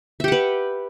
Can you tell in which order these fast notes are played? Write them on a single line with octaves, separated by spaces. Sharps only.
E5 G4 F#5 B4